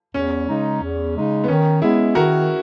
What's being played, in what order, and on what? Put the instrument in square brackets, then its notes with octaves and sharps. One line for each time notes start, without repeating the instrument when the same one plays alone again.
[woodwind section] E2 [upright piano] C#4
[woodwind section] C#3 G#3 D#4
E2
C#3 G#3 D#4
[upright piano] B3
[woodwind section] D#3 [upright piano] C#4
[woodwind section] G#3 B3 [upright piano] E4 G#4
[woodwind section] D#3 [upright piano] F#4 A#4